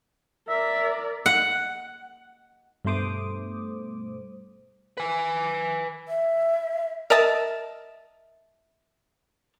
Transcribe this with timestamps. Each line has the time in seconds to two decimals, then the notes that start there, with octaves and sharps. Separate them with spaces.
0.48 A#4 D5 E5
1.26 F#5
2.85 G2 B2 A3 C5 D6 D#6
4.97 B4 G#5
6.08 E5
7.10 A#4 D#5 E5 A5